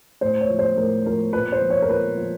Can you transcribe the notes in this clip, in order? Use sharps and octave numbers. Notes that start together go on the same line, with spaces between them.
A2 C5
C#5
F3
C5
A2 A#4
F3 A#4
A#2 B4
C5
F3
C#5
A#4
A#2 B4
F3